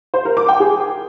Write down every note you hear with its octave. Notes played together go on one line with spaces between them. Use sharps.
C5
A#4
D6
G5
G#4